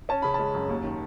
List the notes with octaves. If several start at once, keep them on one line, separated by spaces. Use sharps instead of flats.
C#4 A5
C#3 B5
G#3 A5
F#2
D#2
D#3